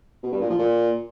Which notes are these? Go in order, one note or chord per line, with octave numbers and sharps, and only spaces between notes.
B2
G2
A#2
F3
A#2